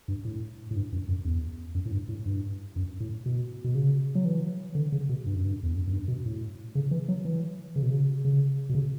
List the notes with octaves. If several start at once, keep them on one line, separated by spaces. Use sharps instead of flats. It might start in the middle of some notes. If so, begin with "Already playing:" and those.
G2
A2
A2
G2
F#2
F#2
E2
F#2
A2
G2
A2
G2
F#2
A2
B2
B2
C#3
F#3
E3
D3
C#3
B2
G2
F#2
G2
E2
F#2
F#2
G2
B2
A2
C#3
E3
F#3
E3
C#3
B2
C#3
C#3
B2
C#3